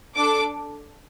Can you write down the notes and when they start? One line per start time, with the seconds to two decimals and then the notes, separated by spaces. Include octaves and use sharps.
0.15 D4 A4 D6